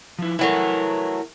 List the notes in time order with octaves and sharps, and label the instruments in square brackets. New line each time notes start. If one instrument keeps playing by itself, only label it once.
[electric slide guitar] F3 E4
[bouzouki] E3 F#3 A3 [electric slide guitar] E4 A#4